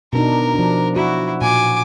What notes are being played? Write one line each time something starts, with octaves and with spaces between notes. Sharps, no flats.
B2 D4 D#4 A#4
F3 D4
E4 F#4
A#2 G#5 D6